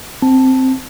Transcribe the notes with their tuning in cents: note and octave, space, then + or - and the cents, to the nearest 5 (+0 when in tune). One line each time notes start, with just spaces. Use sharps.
C4 +0 A5 +0